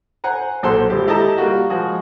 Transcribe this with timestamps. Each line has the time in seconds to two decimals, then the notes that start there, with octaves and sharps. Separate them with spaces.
0.24 C5 F#5 G#5 A#5
0.63 B1 A#2 A4 C5 F#5 C6
0.90 G#1 G4
1.07 E4 G4 A4 D#5 A5 A#5
1.38 G3 A#3 F4 F#4
1.70 F3 G#3 F#4 G#4